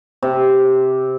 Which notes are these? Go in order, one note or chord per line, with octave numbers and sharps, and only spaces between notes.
C3